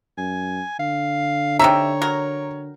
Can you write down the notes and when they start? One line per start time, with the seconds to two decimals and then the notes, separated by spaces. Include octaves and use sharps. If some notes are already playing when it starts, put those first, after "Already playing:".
0.18 F#2 G#5
0.79 D3 F5
1.59 C3 D#4 C#5 E5 G5 A#5
2.02 F#3 A#4